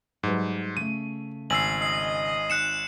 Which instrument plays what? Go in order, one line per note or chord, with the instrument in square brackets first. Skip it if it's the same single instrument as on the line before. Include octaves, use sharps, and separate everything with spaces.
[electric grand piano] G#2 [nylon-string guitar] F#3 G3 B4
[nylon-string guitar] C#3 A3 [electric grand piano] D#7
[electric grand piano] G#1 G#5 E6 [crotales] C7 F#7
[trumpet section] D#5 [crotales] C7
[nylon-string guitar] D#4 [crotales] F#6 C#7 E7